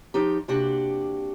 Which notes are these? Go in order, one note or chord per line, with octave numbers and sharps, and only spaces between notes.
F3 D#4 G4
C3 A#3 D4 F#4 G4